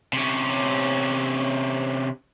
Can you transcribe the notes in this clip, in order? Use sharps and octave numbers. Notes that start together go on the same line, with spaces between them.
C3 C#4